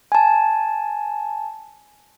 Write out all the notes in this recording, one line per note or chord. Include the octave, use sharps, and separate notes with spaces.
G#5 A5